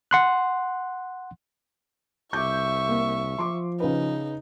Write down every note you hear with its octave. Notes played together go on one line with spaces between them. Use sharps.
F#5 C6 F#6
C2 E5 C#6 D6 G6
A#3
F3 C6 D6
C#3 D#4 B4